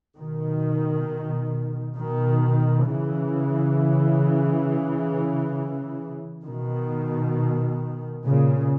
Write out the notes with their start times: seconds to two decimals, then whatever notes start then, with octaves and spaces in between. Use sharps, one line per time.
0.17 B2 D#3
1.97 B2 D#3
2.86 C#3 E3
6.45 B2 D#3
8.24 A#2 C#3